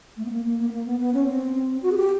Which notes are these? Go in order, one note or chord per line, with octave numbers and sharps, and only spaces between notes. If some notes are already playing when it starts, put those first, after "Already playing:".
A3
B3
A#3
A#3
A#3
B3
A#3
B3
B3
C#4
C4
F#4
G#4
G4